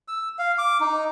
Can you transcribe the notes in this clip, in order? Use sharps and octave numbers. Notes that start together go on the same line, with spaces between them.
E6
F5
D6
D#4